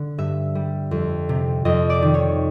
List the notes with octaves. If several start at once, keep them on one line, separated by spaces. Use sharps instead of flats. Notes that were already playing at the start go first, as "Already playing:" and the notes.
Already playing: D3
G2 E5
G3
F2
C3
F2 D#5
D5
D#3
C#5